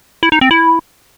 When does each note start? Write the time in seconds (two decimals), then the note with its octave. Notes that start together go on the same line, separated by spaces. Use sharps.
0.23 E4
0.32 D#4
0.41 C4
0.51 E4